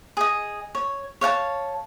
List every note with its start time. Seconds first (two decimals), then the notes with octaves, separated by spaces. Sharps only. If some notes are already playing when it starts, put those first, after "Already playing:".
0.17 G#4 D#5
0.75 C#5
1.21 C#5 F5 F#5 A5